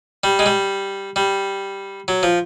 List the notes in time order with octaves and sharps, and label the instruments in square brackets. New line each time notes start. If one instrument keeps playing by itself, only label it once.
[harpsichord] G3
G#3
G3
G3
F#3
F3